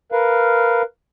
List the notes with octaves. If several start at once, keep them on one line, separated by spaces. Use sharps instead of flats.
A#4 B4 F5